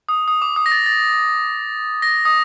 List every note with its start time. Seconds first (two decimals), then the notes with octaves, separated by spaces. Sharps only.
0.09 D#6
0.28 D#6
0.42 D6
0.56 D#6
0.66 A#6
0.72 A6
0.86 A6
2.02 A#6
2.25 D#6